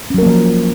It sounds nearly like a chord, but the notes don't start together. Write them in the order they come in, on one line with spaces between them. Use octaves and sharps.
C#4 F#3 A#4 A#3 F3